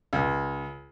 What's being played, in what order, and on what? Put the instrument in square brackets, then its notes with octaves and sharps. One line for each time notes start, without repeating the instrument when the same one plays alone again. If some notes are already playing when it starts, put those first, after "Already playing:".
[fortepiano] C#2